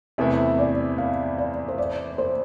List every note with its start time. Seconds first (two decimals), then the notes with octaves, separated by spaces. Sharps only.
0.18 E2 C3 E3 A3 E4 E5
0.58 D5
0.98 F5
1.38 D5
1.68 C5
1.78 D5
2.18 C5